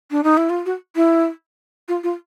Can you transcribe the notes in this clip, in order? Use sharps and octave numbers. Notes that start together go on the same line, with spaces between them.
D4
D#4
E4
F4
F#4
E4
F4
F4